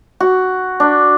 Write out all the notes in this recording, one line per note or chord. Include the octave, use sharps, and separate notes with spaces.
F#4
D4